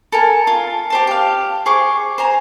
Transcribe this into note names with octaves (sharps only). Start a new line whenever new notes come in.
A4 A#4 G#5
F4
G4 C5 A5
G4 F5
G#4 C5 C#6 D6
C5 G#5 A#5